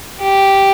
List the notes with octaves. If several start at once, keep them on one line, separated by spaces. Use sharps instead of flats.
G4